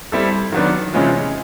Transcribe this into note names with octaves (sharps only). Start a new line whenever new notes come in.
G3 C4 E4 A4
D#3 F#3 B3 D4
C3 E3 G#3 C#4 F4